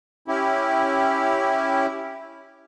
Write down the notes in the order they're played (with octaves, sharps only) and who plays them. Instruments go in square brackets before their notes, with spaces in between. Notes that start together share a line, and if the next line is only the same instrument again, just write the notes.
[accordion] C#4 E4 G4